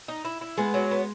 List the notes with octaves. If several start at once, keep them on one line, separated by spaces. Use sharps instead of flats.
D#4
E4
E4
G#3 B3 G#4
F#3
B3